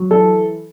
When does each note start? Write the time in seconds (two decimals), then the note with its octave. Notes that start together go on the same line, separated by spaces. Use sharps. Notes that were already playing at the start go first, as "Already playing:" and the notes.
Already playing: F#3
0.10 E3 A4